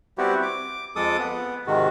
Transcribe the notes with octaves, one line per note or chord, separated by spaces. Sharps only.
G3 B3 C4 E4 F#4 G4
D6
F2 G#3 A4 D6 D#6
B3
G#2 C3 D#3 F#4